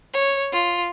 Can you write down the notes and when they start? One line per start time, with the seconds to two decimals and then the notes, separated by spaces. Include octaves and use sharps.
0.13 C#5
0.52 F4